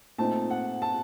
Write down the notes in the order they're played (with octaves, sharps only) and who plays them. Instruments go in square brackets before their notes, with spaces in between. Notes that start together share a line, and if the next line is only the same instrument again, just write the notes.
[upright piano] A#2 A3 C4 D#4 A5
F#5
A5